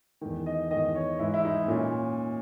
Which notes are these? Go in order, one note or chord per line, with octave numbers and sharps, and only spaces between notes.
E2 D#3
D#5
D#3 D#5
E2
C#5
G#2 E3 E4
E4
D#4
A#2 C#4